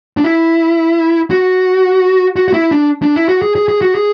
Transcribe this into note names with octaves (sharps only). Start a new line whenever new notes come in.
D4
E4
F#4
F#4
F#4
E4
D4
D4
E4
F#4
G#4
G#4
G#4
F#4
G#4